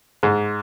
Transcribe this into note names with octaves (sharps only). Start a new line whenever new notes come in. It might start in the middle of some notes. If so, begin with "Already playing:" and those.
G#2